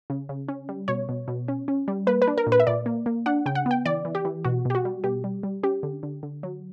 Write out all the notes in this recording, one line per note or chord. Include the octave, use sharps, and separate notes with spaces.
C#3
C#3
C#4
G3
B2 C#5
B2
B2
C#4
C#4
G3
A#3 B4
B4
D4
A#4
A#2
B4
E5
A#2 D5
A#3
A#3
D4 F#5
C#3 G5
F#5
B3 G5
E3 D5
E3
G4
E3
B2 F#4
B2 G4
F#4
G3
B2 G4
G3
G3
C#4 G4
D3
D3
D3
F#3